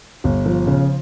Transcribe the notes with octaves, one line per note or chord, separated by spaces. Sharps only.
G1
F3
C#3